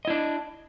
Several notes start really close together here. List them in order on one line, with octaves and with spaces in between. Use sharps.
D#5 E4 D4